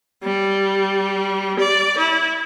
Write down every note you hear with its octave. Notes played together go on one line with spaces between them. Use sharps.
G3
D5
E4